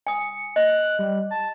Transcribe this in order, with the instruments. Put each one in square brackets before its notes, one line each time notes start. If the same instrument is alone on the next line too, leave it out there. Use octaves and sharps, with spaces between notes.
[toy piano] G#5 D#6 [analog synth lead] C#7
[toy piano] D#5 [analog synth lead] F#6
[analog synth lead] G3
A5